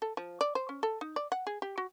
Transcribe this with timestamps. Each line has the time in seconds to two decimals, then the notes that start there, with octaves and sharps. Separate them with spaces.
0.02 A4
0.17 F3
0.41 D5
0.55 C5
0.69 C#4
0.83 A4
1.01 D#4
1.16 D5
1.32 F#5
1.47 G#4
1.62 G4
1.78 F#4